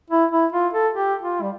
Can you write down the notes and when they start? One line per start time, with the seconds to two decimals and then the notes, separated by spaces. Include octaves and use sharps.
0.10 E4
0.31 E4
0.52 F4
0.73 A4
0.94 G4
1.22 F4
1.42 G3